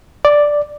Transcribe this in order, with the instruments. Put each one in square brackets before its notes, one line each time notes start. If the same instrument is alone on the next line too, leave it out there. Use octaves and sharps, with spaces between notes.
[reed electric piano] D5